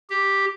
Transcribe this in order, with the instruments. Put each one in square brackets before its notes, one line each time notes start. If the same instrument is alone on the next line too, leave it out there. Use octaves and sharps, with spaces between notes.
[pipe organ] G4